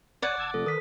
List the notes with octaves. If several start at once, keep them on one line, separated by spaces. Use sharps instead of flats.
D1 C#5 D5 F#5 G#5 A5
F1 A5 E6 G#6
C3 F3 A3 A4
D#3 A#4 B4 D#6 B6